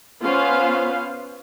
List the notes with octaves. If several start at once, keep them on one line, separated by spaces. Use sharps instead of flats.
B3 C#4 F4 B4 C5 F5